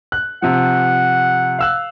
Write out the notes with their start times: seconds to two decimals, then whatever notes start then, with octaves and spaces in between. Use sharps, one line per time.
0.12 F#6
0.42 C3 F3 F#5
1.59 F5 E6 F#6